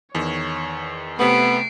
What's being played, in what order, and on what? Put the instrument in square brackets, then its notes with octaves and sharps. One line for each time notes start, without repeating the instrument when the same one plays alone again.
[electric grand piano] E2 D#3 [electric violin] C#5
[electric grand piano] C3 A3 [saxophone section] B3 [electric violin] C7 D7